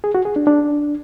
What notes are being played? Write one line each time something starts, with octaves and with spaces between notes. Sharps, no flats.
G#4
F#4
G#4
D4
D4